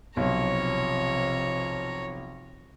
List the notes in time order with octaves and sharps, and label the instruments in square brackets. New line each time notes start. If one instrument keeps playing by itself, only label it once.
[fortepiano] B1 [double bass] C3 F3 [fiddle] C#5 A#5